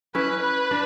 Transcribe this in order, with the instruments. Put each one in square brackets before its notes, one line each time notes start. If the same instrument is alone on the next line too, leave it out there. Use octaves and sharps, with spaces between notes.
[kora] C#4 E4 [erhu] B4
[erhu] B4
[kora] D4